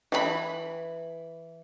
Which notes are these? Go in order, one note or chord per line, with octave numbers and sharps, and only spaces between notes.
E3 G#4 B5